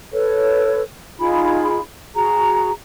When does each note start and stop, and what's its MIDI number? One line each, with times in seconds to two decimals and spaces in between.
0.13 0.82 69
0.13 0.82 71
0.13 0.82 73
1.19 1.80 63
1.19 1.80 65
1.19 1.80 68
1.19 1.80 83
2.15 2.71 66
2.15 2.71 68
2.15 2.71 82